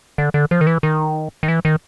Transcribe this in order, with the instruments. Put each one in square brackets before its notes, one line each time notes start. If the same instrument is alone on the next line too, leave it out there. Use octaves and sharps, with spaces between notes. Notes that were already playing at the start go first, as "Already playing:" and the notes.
[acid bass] D3
D3
F3
D#3
E3
D#3
D#3
E3
D#3